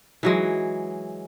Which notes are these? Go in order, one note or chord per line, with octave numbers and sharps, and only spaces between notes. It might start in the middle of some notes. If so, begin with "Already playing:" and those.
E3 F#3 G#3